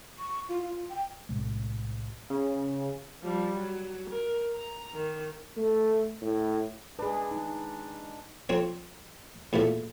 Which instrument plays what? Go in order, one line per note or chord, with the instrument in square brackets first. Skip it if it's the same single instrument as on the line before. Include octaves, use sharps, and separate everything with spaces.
[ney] C#6
F4
F4
G5
[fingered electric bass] B1 A2 C3 G#3
[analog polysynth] C#3
[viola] F3 G3
F#3
A#4
A#5
D#3
[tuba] A3
A2
[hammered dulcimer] G#3 D4 [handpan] G#4 B4
[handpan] D#4
[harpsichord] F2 C4 C#5
E2 A#2 E3 A3